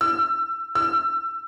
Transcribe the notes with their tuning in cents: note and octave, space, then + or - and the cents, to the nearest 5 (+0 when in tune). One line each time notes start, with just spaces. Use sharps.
E6 +25
E6 +25